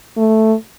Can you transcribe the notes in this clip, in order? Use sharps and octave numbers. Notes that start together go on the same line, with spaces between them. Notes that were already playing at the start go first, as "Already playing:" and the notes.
A3